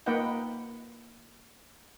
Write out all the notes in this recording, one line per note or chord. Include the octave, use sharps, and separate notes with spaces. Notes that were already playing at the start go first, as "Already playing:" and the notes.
A#3 D#4 B4 D#5 F#5 G5